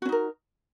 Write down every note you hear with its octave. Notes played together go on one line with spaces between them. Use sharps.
C#4 D#4 F#4 A#4